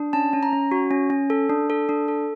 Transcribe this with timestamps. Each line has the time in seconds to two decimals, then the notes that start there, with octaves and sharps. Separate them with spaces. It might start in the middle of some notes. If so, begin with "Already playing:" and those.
Already playing: D4
0.13 C#4 A5
0.33 C#4
0.43 A#5
0.53 C#4
0.71 F#4
0.91 C#4
1.10 C#4
1.30 A4
1.49 D4
1.70 A4
1.89 D4
2.08 A4